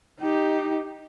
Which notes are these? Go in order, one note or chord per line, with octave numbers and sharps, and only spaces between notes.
D#4 G4